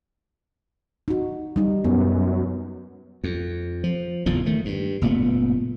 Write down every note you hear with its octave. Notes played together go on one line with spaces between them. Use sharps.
D#4 F#4
G3 D#4
F#2 B3
F2
F3
F#1 E2 A2 F3
D#3 A3
G2
F#1 A#2 A3 B3